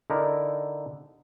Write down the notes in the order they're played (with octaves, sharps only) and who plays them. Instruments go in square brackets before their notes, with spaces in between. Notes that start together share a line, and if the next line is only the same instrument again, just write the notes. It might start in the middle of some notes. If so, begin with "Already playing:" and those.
[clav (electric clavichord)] D3 D#4 E4 A#4